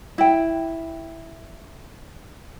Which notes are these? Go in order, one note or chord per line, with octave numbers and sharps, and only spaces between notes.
E4 G5